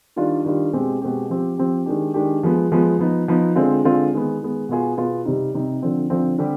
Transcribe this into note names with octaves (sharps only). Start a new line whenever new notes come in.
D#3 G3 D4 F4
D#3 G3 D4 F4
B2 G#3 C4 G4
B2 G#3 C4 G4
F3 C4 G4
F3 C4 G4
D#3 G#3 D4 G4
D#3 G#3 D4 G4
F3 G#3 B3
F3 G#3 B3
F3 B3 D#4
F3 B3 D#4
D3 G#3 C4 F4
D3 G#3 C4 F4
D#3 G#3 B3
D#3 G#3 B3
B2 B3 F4 G#4
B2 B3 F4 G#4
C3 G3 C4 D#4
C3 G3 C4 D#4
D3 F3 C4
D3 F3 C4
D3 G3 C4 G4